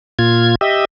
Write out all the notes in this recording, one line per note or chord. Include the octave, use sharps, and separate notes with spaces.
A#2 F4 G#6
G4 D#5 E5